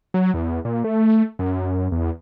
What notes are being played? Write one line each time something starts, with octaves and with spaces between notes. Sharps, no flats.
F#3
E2
A#2
A3
F#2
E2